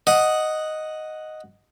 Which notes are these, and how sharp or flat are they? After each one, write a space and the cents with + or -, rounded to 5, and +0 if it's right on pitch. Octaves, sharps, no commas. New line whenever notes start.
D#5 +0 F#5 +0